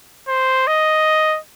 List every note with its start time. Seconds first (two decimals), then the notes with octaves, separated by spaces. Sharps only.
0.28 C5
0.68 D#5